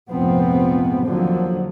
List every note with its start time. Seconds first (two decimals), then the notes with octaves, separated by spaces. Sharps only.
0.11 F1 A#1 G#2 F3 B3 C4
1.03 D#2 D3 F3 F#3